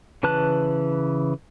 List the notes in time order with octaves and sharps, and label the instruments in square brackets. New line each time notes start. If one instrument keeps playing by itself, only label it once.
[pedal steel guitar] C#3 E3 B4 A5 F#6